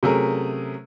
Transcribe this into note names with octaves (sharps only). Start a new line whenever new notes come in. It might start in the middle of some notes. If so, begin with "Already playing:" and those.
C3 F#3 A3 C#4 G#4 A#4